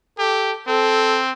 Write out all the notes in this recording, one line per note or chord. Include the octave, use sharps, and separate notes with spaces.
G4 A4
C4 A4